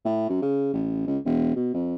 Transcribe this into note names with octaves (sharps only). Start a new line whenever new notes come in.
A2
F#2
C#3
A1
C#2
E1
B2
F2